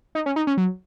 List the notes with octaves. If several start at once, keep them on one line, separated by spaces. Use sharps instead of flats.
D#4
C#4
D#4
C#4
F#3